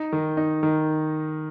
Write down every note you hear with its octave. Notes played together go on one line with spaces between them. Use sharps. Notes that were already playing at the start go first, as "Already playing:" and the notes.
Already playing: D#4
D#3
D#4
D#3